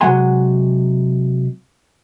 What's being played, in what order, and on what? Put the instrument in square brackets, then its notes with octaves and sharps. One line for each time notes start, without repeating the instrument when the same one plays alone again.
[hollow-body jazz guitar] C3 F#3 G#3 F#5 G#5 C6